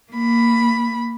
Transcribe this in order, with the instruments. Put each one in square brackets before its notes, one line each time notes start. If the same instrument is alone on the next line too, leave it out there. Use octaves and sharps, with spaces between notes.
[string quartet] A#3 B5